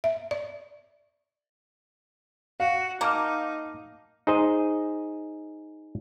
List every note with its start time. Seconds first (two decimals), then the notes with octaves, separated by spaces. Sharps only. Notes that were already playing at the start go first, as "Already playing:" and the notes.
0.04 E5
0.31 D5
2.60 F#4 F5
3.01 A#3 D#4 A5 D6 F6
4.27 D#4 G#4 C5 D#5